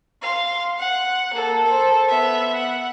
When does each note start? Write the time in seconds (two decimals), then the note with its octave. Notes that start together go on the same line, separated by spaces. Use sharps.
0.21 F5 C6
0.79 F#5
1.34 A#3 A4
1.64 A4 C5
2.08 B3 E5
2.56 F#5